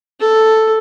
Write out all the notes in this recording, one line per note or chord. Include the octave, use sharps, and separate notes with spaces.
A4